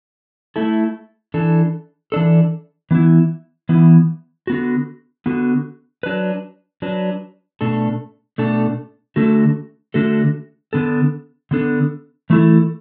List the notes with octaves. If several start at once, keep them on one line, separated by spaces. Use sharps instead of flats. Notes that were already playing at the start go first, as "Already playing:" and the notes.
A3 E4 A4
E3 D4 A4
E3 D4 A4
E3 B3 E4
E3 B3 E4
D3 B3 F#4
D3 B3 F#4
F#3 D4 B4
F#3 D4 B4
B2 A3 D4 A4
B2 A3 D4 A4
D3 A3 D4 F#4 A4
D3 A3 D4 F#4 A4
D3 B3 D4 A4
D3 B3 D4 A4
E3 A3 E4 A4